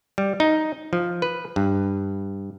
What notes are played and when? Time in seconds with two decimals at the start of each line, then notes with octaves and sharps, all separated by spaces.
0.18 G3
0.40 D#4
0.93 F3
1.22 B4
1.56 G2